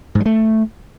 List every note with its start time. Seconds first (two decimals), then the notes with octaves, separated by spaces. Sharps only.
0.15 G#2
0.20 F#3
0.26 A3